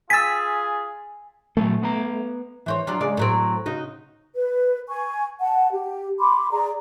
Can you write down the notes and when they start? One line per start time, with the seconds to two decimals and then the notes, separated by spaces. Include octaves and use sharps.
0.10 F4 G#4 G#5 E6 A6 B6
1.57 A#2 F#3 A3 A4
1.82 B3 B4 A#5
2.66 E3 C5 C#5
2.87 F#3 D4 F4
3.00 C#3 G#3 D5
3.17 A2 F#3 C4
3.66 C#3 D#4 F#4
4.36 B4
4.88 G#5 C#6
5.40 F#5 A5
5.72 G4
6.20 B5 C6 D6
6.51 G#4 D5 A#5